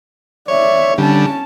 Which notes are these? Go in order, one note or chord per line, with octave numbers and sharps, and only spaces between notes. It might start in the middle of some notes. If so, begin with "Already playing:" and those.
C#5 D5 E5
D3 G3 C#4 A5